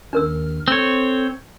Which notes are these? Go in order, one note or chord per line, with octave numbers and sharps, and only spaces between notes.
D#2 D#3 D4 A#4 E6 F6
C4 A4 C#5